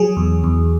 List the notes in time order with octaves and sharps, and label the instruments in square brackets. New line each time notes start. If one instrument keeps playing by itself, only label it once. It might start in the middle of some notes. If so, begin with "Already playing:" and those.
Already playing: [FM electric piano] F#3 G#4
E2
E2